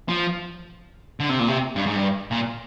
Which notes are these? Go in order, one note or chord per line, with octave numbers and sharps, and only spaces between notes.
F3
D3
C3
A#2
C3
G2
G#2
G2
A#2